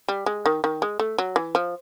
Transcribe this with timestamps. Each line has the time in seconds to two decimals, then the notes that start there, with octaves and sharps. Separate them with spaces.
0.08 G3
0.26 G#3
0.46 D#3
0.64 D#3
0.82 G#3
0.99 A3
1.18 F#3
1.36 E3
1.55 F3